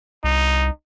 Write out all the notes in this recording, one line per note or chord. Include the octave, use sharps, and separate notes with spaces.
C2 D#4